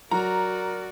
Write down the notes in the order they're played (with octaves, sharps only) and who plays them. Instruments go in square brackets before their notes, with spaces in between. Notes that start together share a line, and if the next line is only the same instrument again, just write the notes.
[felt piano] F#3 [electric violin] F#4 D5 [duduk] A#4 [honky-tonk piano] A#5